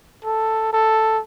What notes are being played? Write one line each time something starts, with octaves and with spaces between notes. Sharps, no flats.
A4
A4